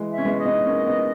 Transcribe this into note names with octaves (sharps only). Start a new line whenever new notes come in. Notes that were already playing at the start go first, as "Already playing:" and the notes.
Already playing: E3 G#3
E5
C#4
G#3 B3
D#5
B3 D#4
A#3 C#4
B3 D#4